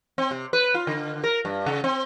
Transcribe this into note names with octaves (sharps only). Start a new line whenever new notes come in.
C4
C3
B4
F4
D3
A#4
G2
C#3
C4